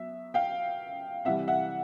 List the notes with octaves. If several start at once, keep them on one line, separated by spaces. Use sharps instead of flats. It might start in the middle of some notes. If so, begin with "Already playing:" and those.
Already playing: F#3 B3 E5
F5 G5
C3 E3 G3 E5 F#5
E5 F#5